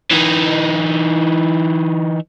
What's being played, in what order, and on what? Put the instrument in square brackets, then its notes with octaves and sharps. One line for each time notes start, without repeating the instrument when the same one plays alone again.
[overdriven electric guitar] E3 D#4